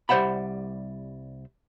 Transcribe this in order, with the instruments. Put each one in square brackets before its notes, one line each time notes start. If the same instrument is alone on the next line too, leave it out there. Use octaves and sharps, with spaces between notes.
[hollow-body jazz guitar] C2 G3 C5 E5 F#5 B5